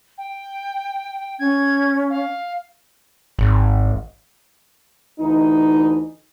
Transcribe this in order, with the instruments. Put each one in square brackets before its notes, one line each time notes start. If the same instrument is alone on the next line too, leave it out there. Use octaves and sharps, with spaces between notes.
[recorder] G5
[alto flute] C#4 [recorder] G#6
[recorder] F5
[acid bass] G#1
[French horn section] D2 E3 D#4